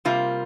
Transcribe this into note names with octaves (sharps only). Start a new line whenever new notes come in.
C3 G3 A#3 F4